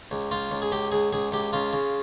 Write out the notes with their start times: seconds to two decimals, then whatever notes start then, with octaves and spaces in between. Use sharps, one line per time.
0.11 C#2
0.31 C#2 F4
0.51 C#2
0.62 G#4
0.72 C#2 G4
0.92 C#2 G#4
1.13 C#2 G#4
1.32 C#2 G4
1.53 C#3 F4
1.73 C#3